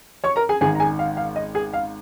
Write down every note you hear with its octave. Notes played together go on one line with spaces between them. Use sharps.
C#5 C#6
A#4 A#5
G#4 G#5
G#1 G#2 D#3 G#4 G#5
A#5
G#4 G#5
F5
F5
D#5
G#4 G#5
F5